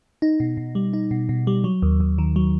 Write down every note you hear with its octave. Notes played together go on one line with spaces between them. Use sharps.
D#4
B2
B2
G3
D#4
B2
B2
G3
F#3
D#2
D#2
D#3
F#3